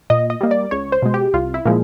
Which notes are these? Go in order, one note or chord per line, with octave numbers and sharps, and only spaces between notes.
A#2 D#5
D#5
G3 A#3
D5
C#2 C#5
C5
B2 G#3
G4
C2 F4
E4
A#2 F3 G#3